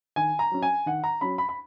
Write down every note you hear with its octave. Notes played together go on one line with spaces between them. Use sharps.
D#3 G#5
A#5
F#3 C#4
G#5
D#3 F#5
A#5
F#3 C#4 B5
B5
B5